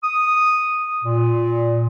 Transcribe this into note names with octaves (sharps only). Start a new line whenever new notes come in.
D#6
A#2